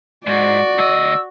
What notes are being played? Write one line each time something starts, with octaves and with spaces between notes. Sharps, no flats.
G#2 F#4 D5
D2 D#5 E6